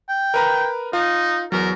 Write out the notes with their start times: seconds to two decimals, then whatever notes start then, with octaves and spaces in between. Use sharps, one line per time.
0.09 G5
0.34 A#4 B4 A#5
0.93 D#4 F4
1.52 E2 F#3 A#4